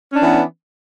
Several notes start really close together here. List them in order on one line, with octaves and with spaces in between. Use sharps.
C#4 D4 E3 B3